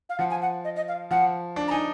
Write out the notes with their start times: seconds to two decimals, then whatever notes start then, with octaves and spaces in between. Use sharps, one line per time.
0.09 F5
0.19 F3 F#5
0.30 G#5
0.42 F#5
0.65 D#5
0.76 D#5
0.88 F5
1.11 F3 F#5
1.56 D4
1.68 A#5
1.71 D#4 G#5